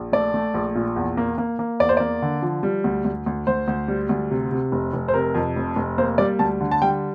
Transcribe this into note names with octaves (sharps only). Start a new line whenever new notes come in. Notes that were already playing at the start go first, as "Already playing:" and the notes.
Already playing: A#1
A3 D5
A3
A#1
A#2
E2
A#3
A#3
A#3
E2 D5
C5
A#3 D5
D3
F3
G3
D2
D2
D2
D2 C5
D2
G3
D2
C3
C3
F1
F1
C5
C3 A#4
F2
F1
F1
A#3 C5
G3 D5
D2 A5
D3
A5
G3 G5